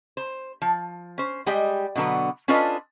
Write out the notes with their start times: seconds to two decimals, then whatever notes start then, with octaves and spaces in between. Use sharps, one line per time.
0.17 C5
0.62 F3
1.18 C#4 C5
1.46 G3 G#3 G4 D5 D#5 G5
1.95 B2 D3 E3 F#3 B3
2.48 C#4 D4 F4 A4 B4 D#5